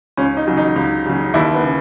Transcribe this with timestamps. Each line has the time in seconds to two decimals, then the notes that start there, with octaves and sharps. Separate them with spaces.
0.17 C#2 C#4
0.37 D#4
0.47 C#3 F#3
0.57 D#4
0.76 C#2
1.05 C#3 F#3
1.34 D#2 E4
1.54 B3
1.63 C#3